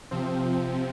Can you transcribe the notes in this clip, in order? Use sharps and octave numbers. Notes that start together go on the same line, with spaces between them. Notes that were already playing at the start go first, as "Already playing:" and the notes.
C3 F3 C4